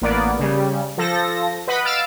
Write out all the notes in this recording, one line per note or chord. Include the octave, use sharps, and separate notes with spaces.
A1 A#3 B3 D5
C#3 G3
F3 A4 A#6
B4 D#5 F#5 B5
F5 E6 F6 A6 D7